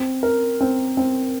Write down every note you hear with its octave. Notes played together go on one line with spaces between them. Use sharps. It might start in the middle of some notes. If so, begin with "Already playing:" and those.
Already playing: C4
A#4
C4
C4